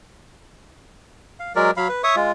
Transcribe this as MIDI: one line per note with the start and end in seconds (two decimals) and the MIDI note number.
1.40 1.53 77
1.56 1.71 54
1.56 1.71 56
1.56 1.71 70
1.56 1.71 74
1.77 1.88 54
1.77 1.88 77
1.77 1.88 83
1.89 2.02 71
2.04 2.16 73
2.04 2.16 76
2.04 2.16 85
2.04 2.16 87
2.16 2.32 56
2.16 2.32 65